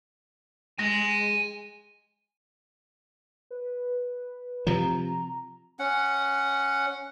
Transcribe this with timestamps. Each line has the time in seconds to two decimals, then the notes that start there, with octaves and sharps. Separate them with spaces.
0.79 G#3 G#5 C6 A#6
3.51 B4
4.67 C3 F3 A#5
5.79 C#4 F#5